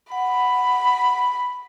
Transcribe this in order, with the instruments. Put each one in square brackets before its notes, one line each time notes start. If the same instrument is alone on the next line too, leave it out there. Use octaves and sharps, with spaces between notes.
[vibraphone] F#5 [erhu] B5